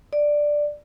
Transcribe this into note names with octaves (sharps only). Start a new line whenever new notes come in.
D5